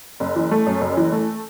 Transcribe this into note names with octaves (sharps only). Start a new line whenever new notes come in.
F#1
E3
A3
F#2
F#1
E3
A3